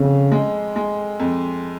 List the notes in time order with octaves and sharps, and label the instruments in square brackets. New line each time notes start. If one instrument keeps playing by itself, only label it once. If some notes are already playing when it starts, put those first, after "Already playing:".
Already playing: [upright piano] F2 [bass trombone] C#3
[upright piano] G#3
G#3
F2